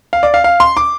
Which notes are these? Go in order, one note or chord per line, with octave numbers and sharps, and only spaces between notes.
F5
D5
F5
F5
C6
D6